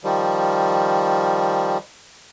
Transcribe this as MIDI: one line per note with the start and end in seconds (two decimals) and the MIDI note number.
0.04 1.78 51
0.04 1.78 53
0.04 1.78 55